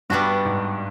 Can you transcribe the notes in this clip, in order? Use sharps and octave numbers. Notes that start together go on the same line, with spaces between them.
G2 G3 B3 D4 F#4
G#2